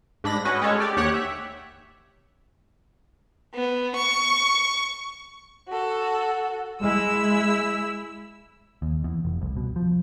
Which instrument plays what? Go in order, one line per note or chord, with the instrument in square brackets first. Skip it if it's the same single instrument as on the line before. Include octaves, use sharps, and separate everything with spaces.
[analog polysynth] G#2 D4 B5 A#6
C#4 F#4 B4 D#5
G#3 C#4 A4 C#5
G4 D5
D#2 G4 C#5 F#5 F#6
E5
[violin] B3
C#6
[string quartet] F#4 A4
[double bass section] G#3 [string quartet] E4 E6
[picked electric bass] D#2
E2
F1
C2
B2
F3